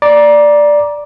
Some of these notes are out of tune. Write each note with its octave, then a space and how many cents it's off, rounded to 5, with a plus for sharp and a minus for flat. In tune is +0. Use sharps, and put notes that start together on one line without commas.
D5 +0 A#5 +25